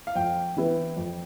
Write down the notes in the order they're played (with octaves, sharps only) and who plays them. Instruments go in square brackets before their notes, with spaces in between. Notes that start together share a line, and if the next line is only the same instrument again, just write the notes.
[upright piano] F5
[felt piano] F2 [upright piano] G5
[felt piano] E3 B3 E4 B4
F2